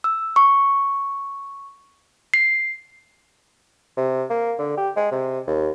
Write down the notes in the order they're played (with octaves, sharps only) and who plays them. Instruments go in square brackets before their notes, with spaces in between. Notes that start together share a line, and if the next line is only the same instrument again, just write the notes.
[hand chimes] E6
C#6
C7
[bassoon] C3
A#3
D3
G4
G#3
C3
D#2